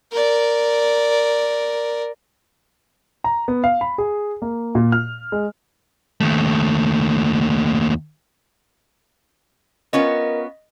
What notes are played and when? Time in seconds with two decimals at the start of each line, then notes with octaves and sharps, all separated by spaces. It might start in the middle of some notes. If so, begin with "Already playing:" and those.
0.12 A#4 D5
3.24 A#5
3.48 B3
3.64 F5
3.81 B5
3.98 G#4
4.42 A#3
4.75 A#2
4.92 F6
5.32 G#3
6.21 D#2 A3
9.93 B3 C#4 F4 A#4 D#5